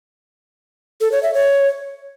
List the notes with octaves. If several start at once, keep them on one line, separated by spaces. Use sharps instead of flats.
A4
C#5
E5
C#5